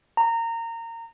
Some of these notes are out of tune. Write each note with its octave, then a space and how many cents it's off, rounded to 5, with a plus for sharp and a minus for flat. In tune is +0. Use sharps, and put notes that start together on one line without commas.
A#5 -20